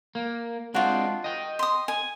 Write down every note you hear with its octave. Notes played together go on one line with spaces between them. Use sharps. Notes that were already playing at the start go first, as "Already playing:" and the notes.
A#3
G#3 C4 D4 F4 F#4
D#5 G5
C6 D#6
G#5